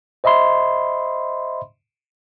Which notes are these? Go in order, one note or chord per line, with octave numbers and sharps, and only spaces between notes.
C5 D#5 E5 B5 C6